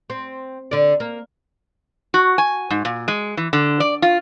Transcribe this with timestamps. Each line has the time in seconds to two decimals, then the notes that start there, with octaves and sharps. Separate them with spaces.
0.10 C4
0.71 D3 D5
1.00 A#3
2.14 F#4
2.38 G#5
2.70 G#2
2.85 A#2
3.08 G#3
3.37 E3
3.53 D3
3.80 D5
4.02 F4